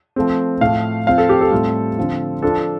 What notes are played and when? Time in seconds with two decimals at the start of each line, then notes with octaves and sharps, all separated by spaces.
0.16 F3 A3 C4
0.61 A2 F3 A3 F5
1.07 F3 C4 F4 F5
1.18 A4
1.29 G4
1.41 A4
1.51 A2 G3 C4 F4
1.98 D3 F3 C4 F4
2.42 F3 D4 F4 A4